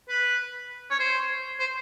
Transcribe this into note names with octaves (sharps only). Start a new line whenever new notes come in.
B4
C#5
C5
C5